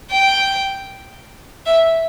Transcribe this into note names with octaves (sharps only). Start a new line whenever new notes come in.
G5
E5